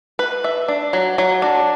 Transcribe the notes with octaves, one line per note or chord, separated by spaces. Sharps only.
B4
E5
D4
F#3
F#3
D4